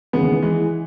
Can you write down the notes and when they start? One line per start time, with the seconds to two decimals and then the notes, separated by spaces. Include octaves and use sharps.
0.13 D#2 C#3 E3 G#3 B3
0.42 E3 G#3